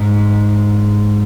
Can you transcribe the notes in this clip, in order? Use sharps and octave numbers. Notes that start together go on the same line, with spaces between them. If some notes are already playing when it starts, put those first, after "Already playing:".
Already playing: G#2